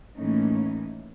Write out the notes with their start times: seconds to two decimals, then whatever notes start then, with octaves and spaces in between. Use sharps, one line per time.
0.18 A2 E3 A3 A#3 C#4 D#4